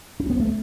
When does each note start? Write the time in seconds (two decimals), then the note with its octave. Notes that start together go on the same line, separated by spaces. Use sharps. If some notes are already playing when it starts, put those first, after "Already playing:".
0.20 C#4
0.30 B3
0.40 A3